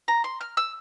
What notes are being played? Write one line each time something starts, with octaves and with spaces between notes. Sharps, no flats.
A#5
C6
F6
E6